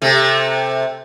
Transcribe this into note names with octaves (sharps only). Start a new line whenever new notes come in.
C3 A3